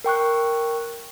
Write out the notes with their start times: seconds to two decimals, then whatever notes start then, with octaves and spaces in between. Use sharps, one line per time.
0.04 A#4 G5 C#6 F#6